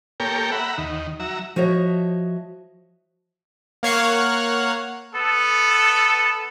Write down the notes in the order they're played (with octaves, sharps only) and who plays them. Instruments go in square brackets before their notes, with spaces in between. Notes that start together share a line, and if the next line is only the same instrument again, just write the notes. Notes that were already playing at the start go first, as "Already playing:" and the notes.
[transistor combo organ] A#3 G4 A4 A#4 C#5 G5
E5 F#5 A#5 B5
D#2 D#3
F#3 E5 A#5
[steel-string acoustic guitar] F3 F#4 C#5 D#5 E5
[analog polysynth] A#3 C#5 F5 F#5
[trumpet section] B3 A4